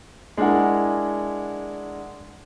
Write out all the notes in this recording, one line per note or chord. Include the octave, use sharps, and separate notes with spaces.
G#3 D4 E4 A#4 F#5